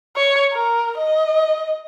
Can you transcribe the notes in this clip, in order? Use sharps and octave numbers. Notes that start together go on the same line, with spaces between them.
C#5
A#4
D#5